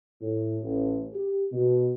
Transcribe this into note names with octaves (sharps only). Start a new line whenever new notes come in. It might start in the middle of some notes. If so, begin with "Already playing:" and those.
A2
A1
G4
B2